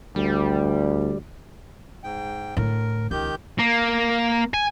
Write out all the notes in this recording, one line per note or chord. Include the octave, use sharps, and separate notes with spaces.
D2 G3
G#2 G5
A2 D3 A#4
C#2 D#3 G4 G6
A#3
G#5